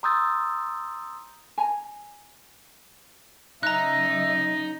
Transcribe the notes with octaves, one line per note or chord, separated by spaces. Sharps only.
A#5 C6 D#6 E6 G6 A6
G#5 A#5
C#3 F#3 D#4 D#5 E5 A#5 F#6